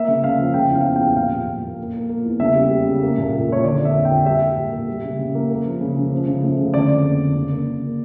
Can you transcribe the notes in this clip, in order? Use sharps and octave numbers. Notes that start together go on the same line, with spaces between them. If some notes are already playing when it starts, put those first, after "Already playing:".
Already playing: A#3 E5
C#3
C#3 F5
F3
C#3 G5
E2
F5
E2
G5
G3
A#2 F5
F3
A#2
A#3
A#3
A#3
A#3
E2
C#3 E5
G3
G3
C#3
A#3
A#2
A#2
A#3 C#5
D3 D5
F2
E5
D3
G5
A#3
G3 E5
G3
A#2
A#3
G3
C#3
C#3
A#3
A#3
F3
C#3
C#3
F3
C#3
A3
C#3
D3 D5
F2
A#3
D3
C#3
A#3
C#3
A#3